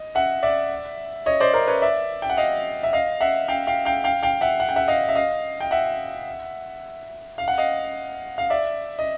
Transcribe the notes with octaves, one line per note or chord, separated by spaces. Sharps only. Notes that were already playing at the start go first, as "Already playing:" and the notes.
Already playing: D#5
E5 F#5
D5 E5
C#5 D#5
C5 D5
A#4 C5
B4 C#5
D5 E5
G5
F#5
D#5 F5
E5
D#5 F5
E5 F#5
F5 G5
F5 G5
F5 G5
F5 G5
F5 G5
E5 F#5
F#5
G5
E5 F#5
D#5 F5
E5
D#5 F5
G5
E5 F#5
F5
F#5
D#5 F5
F5
D5 E5
D#5